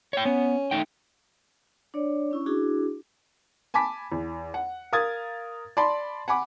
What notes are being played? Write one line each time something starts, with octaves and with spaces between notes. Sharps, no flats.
C#5 G5
B3 C#4
A3 D#4 G5
D4 C#5 D5
C#4 E4 C#6
D4 E4 F#4 G#4
G#5 A5 B5 D6 B6
E2
F#5
A#4 F5 D#6 G#6 A6
D5 A5 B5 C6
F#5 G#5 B5 D6